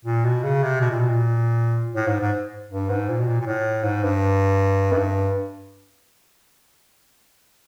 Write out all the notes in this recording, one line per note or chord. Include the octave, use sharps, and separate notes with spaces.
A#2
B2
C#3
C3
B2
A#2
B2
A#2
A2
G#2
G#2
G2
G#2
A#2
B2
A#2
A#2
A2
G#2
G2
F#2
G2